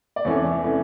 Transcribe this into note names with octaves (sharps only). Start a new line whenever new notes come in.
D5
E2 C3 E3 A3 C#4 C#5
C3 E3 A3 C#4